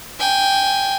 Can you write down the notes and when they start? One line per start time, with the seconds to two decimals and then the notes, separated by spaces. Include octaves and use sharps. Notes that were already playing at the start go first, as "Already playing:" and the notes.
0.19 G5 G#5